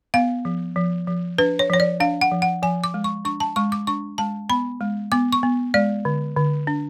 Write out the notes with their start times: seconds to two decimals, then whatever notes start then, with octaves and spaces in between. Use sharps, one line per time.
0.14 B3 F5
0.45 F3
0.76 F3
1.07 F3
1.38 D4 B4
1.59 C#5
1.70 F3 C#5
1.80 D5
2.00 D4 F5
2.21 F#5
2.32 F3
2.42 F#5
2.63 F3 G#5
2.84 D6
2.94 G#3
3.04 C#6
3.25 D4 C#6
3.40 A5
3.56 G#3 C#6
3.72 D6
3.87 D4 C#6
4.18 G#3 A5
4.49 B3 B5
4.81 G#3
5.12 B3 D6
5.32 C#6
5.43 B3
5.74 G#3 D5
6.05 D3
6.36 D3
6.67 D4